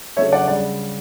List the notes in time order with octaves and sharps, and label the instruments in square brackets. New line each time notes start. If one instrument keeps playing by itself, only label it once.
[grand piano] C#3 F#3 A3 D4 C#5 E5
D5 F#5
C#3 G3 D5